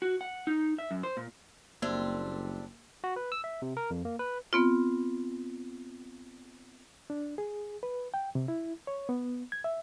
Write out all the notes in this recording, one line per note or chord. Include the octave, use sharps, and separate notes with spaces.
F#4
F#5
D#4
E5
F#2
C5
A#2
F#1 G3 A#3 C4 D4
F#4
B4
E6
E5
C3
A#4
F2
A#3
B4
B3 C4 F4
D4
G#4
B4
G5
C3
E4
C#5
B3
G#6
E5